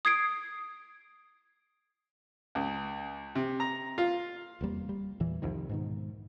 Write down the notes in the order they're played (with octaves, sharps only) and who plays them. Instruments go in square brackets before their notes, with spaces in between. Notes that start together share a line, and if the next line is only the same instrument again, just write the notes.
[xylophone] D#6 G#6 C7 D7
[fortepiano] C#2
C3
A#5
F4
[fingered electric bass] F1 E2 G3 A#3
G3
E2 A#2 E3
C2 F2 D#3
G#2 B2 D#3